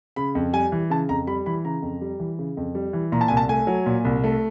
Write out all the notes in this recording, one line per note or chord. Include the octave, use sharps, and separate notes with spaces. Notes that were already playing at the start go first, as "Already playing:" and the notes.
C#3 B5
F2
G3 G#5
E3
C#3 A5
F2 A#5
G3 B5
E3 B5
C#3 A#5
F2
G3
E3
C#3
F2
G3
E3
A#2 A#5
A5
C2 G#5
A5
A3 G#5
F#3
A#2
C2
A3